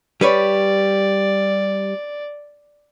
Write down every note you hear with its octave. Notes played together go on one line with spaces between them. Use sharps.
G3 B4 C#5 D5